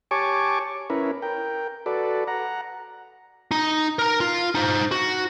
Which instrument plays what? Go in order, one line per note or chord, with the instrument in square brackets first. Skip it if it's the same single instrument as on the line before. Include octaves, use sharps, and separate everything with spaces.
[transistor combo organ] G4 C#5 G#5 A5 C#6 D6
C#4 E4 A#4 B4
A#4 G5
F#4 A4 B4 D5
F#5 A#5
[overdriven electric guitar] D#4
A#4 A#5
F4
D#4 C5
F#4